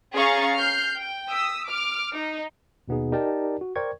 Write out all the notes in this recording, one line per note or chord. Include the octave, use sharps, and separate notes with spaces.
C#4 G#4 F5 A#5 C#6 A6
F6 G6 C7
G5
D#6 E6 B6
D6 F6
D#4
D#2 B2 B3 D#4 G#4
D#4 G4 A#4 D5 G5 A5
F#4
A#4 C5 D5 G5 C#6 G#6